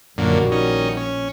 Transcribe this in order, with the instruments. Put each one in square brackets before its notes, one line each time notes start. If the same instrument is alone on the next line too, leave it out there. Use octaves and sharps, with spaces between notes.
[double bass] A#1 [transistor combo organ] F#2 A#2 D3 [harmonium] D#3 G3 F#4
[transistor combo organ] C#4 D#4
C#4